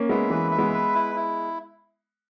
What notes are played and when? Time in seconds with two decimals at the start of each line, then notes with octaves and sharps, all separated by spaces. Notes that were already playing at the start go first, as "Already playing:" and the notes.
Already playing: A#3 C#4
0.09 G#3 B3 E5
0.30 E3 G#3 B4
0.52 E5
0.58 G#3 B3
0.74 B4
0.94 E4
1.16 E4